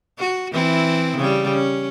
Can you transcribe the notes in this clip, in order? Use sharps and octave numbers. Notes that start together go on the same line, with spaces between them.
F#4
E3 C4 E4
C#3 G3
C#4